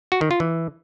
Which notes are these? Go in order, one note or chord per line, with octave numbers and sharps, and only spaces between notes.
F#4
D#3
F4
E3